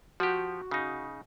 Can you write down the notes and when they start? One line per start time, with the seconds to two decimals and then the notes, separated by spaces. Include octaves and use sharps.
0.20 F3 F#4 G4
0.71 C#3 D#4